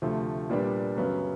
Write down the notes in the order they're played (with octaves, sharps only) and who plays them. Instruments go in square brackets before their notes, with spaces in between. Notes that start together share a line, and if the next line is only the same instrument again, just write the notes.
[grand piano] D2 C3 F3 A3
A#2 G3 B3 D4
F#2 C#3 F#3 B3